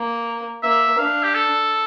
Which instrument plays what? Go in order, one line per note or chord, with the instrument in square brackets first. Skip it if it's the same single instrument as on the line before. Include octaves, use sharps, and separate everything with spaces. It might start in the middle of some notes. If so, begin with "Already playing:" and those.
Already playing: [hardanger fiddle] A#3
[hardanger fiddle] A#3 [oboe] E5
[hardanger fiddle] D4 [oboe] F5
[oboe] G4
A4